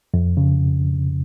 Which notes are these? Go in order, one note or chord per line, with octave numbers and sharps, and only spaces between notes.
F2
C#3